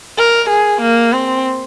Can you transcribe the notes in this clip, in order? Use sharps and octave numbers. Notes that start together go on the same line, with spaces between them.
A#4
G#4
A#3
C4